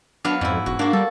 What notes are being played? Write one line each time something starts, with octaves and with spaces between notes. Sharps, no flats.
F#3 B3 D4 F5
F2 G#2 E4
E1 F#4
A#3 D4 F#4
G3 A4